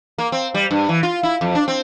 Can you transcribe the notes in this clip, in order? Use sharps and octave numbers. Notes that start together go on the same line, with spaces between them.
A#3
C4
G3
G2
E3
F4
E4
F2
D4
C4